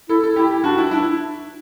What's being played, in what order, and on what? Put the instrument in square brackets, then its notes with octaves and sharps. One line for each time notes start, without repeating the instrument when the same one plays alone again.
[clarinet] E4 [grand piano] A4
[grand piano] A4
[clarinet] E4 [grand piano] G4
[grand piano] G4
[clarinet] D4 [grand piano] F#4
[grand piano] E4
[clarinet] D4 [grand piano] E4